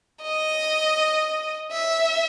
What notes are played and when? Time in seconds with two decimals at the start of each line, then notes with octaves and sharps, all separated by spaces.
0.23 D#5
1.71 E5